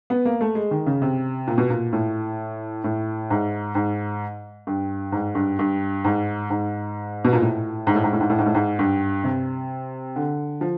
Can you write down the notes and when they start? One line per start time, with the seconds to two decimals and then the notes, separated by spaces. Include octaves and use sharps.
0.10 B3
0.25 A#3
0.41 A3
0.55 G#3
0.71 D#3
0.86 C#3
1.02 C3
1.47 A#2
1.58 B2
1.70 A#2
1.93 A2
2.84 A2
3.30 G#2
3.75 G#2
4.67 G2
5.12 G#2
5.35 G2
5.59 G2
6.04 G#2
6.50 G#2
7.25 B2
7.33 A#2
7.42 A2
7.87 G#2
7.95 A2
8.04 G#2
8.13 A2
8.20 G#2
8.30 A2
8.38 G#2
8.46 A2
8.55 G#2
8.79 G2
9.24 C3
10.16 D3
10.61 F3